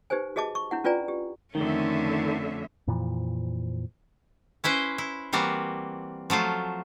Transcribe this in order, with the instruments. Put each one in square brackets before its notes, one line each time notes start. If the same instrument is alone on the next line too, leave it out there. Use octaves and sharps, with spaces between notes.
[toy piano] D#4 G4 B4 C5 G#5
F#4 G#4 D#5 A5 D6
C#6
D4 E4 F#5
C#4 F4 B4 D5 G#5 A#5
G4
[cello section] F2 D3 E5 [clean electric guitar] D#3 [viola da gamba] A3 C#4
[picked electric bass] F2 A#2 E3 F3
[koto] C#4 E4 B4 C5
E4
E3 G3 A#3 C4 F#4
F3 F#3 A3 F4